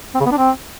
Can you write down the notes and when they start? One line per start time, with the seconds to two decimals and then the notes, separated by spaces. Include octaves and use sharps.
0.15 C4
0.20 C#3
0.26 B3
0.32 D4
0.37 C4